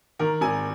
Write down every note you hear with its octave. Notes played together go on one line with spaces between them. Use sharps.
D#3 A#4
G#1 G#5